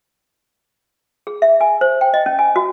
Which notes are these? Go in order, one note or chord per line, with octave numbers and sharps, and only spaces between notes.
G#4
E5
G#5
C5
G5
D#5
C#4
G#5
F#4